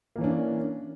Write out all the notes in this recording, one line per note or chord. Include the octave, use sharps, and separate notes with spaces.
E3 A#3 C#4 D4